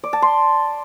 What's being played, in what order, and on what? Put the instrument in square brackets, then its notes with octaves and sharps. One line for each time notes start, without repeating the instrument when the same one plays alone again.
[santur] D5
A5
C6